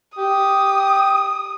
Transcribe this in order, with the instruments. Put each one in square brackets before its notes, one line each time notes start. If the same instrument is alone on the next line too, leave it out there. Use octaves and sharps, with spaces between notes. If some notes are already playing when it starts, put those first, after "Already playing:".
[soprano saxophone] G4 [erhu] D#6